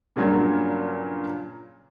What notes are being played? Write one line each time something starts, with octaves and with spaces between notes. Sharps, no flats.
G2 A#2 C#3 F#3 A#3 G#6